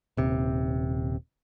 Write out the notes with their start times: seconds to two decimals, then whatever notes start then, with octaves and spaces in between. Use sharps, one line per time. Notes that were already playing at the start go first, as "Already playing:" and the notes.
0.17 D#1 C3